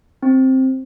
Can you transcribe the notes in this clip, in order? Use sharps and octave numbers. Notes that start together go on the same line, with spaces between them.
C4